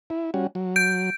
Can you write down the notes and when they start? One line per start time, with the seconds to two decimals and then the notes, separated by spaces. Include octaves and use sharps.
0.10 E4
0.34 G3 C#4 F#4
0.55 F#3
0.76 G6 D7